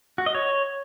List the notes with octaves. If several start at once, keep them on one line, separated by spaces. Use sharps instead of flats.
F#4
D#5
C#5